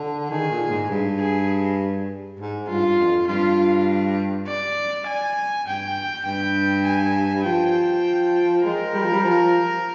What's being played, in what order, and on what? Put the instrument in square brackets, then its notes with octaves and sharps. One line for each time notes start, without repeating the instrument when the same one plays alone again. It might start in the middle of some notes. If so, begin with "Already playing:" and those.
Already playing: [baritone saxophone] D3
[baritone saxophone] D#3 [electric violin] G#4
[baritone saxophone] A#2
G#2
G2
[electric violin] G#4
[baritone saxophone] G#2
[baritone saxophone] G2 [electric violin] F4
[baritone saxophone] F2
[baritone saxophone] G2 [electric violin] F4
[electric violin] D5
G#5
[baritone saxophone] G2 [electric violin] G5
[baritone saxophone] G2 [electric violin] G5
[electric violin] G#5
[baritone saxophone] F3 [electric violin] G5
[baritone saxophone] G#3 [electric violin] A#4
[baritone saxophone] G3
F3
G3
F3